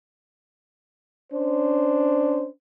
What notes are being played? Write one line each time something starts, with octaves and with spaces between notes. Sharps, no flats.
C#4 D4 C5